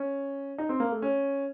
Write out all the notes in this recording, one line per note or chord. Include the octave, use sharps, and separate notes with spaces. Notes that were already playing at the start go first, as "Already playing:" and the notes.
Already playing: C#4
D#4
C4
A#3
A3
C#4